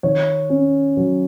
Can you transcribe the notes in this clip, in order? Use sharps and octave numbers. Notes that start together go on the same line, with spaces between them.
D#3 C#5
C#4
F#3